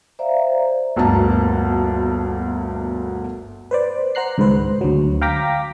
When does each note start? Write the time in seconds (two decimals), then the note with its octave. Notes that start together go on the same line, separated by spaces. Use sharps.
0.19 C5 D5 E5 F5 A#5
0.96 G1 D2 B2 A#3 A5
3.71 B4 C5 D5
4.15 C5 F#5 A#5 F#6 C7
4.38 C#2 G#2 D#3 B4 C5
4.81 D2 F#3
5.21 F5 G5 A#5 D6 A#6 B6